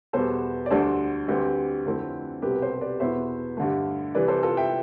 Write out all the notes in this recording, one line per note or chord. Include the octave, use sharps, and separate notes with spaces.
E2 B2 G3 B3 A4 C5
D5
D2 D3 G3 D4 A4 C5
D2 D3 G3 C4 G4 B4
F2 D3 A3 C4 E4
C2 B2 G3 C4 G4 B4
B4
A4 C5
B4 D5
E2 B2 B3 E4 C5 E5
G2 D3 A3
C3 E3 G3 B4 D5
A4 C5
F4 A4
E5 G5